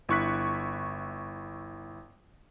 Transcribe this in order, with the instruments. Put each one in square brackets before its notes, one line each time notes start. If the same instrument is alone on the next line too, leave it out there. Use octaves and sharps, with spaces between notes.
[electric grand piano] G1 E4 C#6 F#6 B6